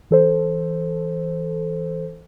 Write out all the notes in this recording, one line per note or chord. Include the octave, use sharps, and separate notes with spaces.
E3 A4 C5